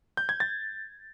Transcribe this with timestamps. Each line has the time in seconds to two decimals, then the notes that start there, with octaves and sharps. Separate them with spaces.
0.17 G6
0.29 G#6
0.40 A6